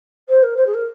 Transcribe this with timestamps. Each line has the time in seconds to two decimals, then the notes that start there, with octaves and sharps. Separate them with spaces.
0.29 C5
0.43 A#4
0.56 C5
0.66 G#4
0.74 A#4